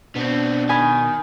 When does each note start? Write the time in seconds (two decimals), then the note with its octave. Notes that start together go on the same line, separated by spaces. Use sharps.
0.15 B2 B3 C4 D4
0.69 D#3 G#5 B5 D#6